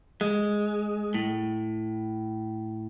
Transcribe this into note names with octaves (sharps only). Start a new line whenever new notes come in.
G#3
A2